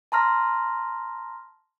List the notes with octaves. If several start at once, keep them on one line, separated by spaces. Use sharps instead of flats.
A5 A#5 C6 F6 A#6